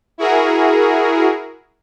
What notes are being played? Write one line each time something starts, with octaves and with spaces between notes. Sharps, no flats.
E4 F#4 G#4 A#4